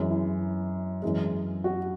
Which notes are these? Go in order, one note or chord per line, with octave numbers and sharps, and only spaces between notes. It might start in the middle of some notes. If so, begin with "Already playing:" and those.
Already playing: F#2 E3 G#3
E4
F#2 E3 G#3
F#4